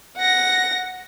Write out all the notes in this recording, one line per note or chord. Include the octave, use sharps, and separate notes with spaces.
F#5 A#6